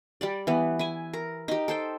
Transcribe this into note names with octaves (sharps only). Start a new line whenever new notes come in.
G3 G4 D5
E3 B3
E4 G#5
A#4
D#4 G4
A4 C5 G5